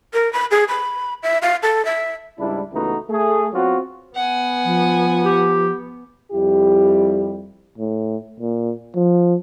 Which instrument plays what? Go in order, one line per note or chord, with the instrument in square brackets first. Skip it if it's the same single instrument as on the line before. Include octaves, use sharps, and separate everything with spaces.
[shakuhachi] A#4
B5
G#4
B5
E5
F5
A4
E5
[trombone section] C#2 G#2 G3 D4 E4
C#2 E3 A3 B3 D#4 F#4
A3 G#4
F#3 B3 C4 F4 F#4
[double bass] B3 [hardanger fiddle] F#5 G#5
[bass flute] F3
[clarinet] G4
[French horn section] F2 G3 E4 G4
[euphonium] A2
A#2
F3